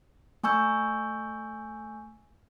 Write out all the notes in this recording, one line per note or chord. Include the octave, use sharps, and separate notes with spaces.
A3 G#5 C#6 E6 G6